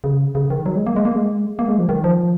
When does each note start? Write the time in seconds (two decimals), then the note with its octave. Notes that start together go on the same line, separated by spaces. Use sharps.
0.04 C#3
0.35 C#3
0.50 D#3
0.66 F#3
0.76 G#3
0.87 A#3
0.96 G#3
1.05 A#3
1.14 G#3
1.59 A#3
1.68 G#3
1.78 F3
1.89 D#3
2.04 F3